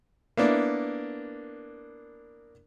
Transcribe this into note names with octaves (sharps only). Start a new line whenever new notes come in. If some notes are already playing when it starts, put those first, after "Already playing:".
A#3 B3 D4 E4